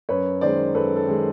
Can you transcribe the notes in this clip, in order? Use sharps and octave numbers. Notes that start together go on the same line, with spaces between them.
F#2 B4 C#5
D#3 G#3 C5 D5
F#2 A4 B4
A4
D#3 G#3